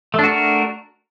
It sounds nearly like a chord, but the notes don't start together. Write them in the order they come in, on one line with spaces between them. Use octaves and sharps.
A3 D4 F#4 A#4